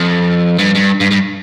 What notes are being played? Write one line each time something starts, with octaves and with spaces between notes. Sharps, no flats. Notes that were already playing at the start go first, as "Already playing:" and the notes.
Already playing: F2
G2
G2
G2
G2